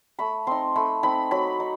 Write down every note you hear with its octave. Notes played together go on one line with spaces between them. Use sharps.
A3 B5
C4 D#4 C6
A3 B5
C4 D#4 B5
F#3 B5
D#4